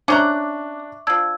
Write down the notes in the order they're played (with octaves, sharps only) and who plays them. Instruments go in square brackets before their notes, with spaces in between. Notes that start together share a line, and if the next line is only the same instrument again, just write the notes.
[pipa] C#4 C5 A#5 [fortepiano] D4 F#6 [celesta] E5 C#6 D6
[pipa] F3 D4 [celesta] E6 G#6